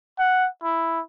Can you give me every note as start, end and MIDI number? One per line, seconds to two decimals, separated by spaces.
0.19 0.48 78
0.63 1.01 64